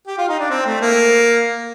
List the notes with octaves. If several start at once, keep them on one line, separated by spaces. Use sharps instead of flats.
G4
F4
D#4
D4
C4
A3
A#3